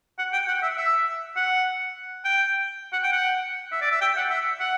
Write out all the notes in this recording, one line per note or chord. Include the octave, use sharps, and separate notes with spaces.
F#5
G5
F#5
E5
E5
F#5
G5
F#5
G5
F#5
E5
D5
E5
G5
F#5
E5
F#5